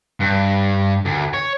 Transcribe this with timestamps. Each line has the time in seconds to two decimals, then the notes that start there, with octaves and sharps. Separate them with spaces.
0.20 G2
1.05 D2
1.34 C#5